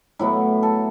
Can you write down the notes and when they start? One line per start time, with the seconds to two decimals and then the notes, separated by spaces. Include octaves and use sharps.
0.19 A2 F#3 B3 E4
0.63 A4